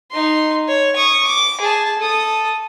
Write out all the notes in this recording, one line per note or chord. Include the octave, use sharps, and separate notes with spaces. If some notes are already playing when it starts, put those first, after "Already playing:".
D#4 C6
C#5
C#6 D#6
D6
G#4 A5
A4 D#6